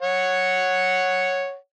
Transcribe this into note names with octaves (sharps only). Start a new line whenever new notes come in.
C#5 F#5